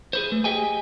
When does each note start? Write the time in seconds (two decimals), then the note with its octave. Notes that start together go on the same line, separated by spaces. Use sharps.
0.13 G#4 B4 C5
0.32 A3
0.44 G4 G#4 D#5 G5 G#5